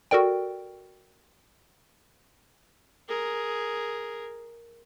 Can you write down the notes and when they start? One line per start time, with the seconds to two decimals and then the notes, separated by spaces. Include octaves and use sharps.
0.11 F#4 A4 A#4 D5 G5
3.08 G#4 A#4